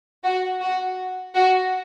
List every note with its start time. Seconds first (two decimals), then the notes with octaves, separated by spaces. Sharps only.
0.23 F#4
0.61 F#4
1.35 F#4